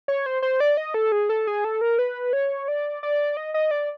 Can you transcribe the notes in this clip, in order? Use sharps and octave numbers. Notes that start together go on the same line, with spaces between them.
C#5
C5
C5
D5
D#5
A4
G#4
A4
G#4
A4
A#4
B4
C#5
D5
D5
D#5
D#5
D5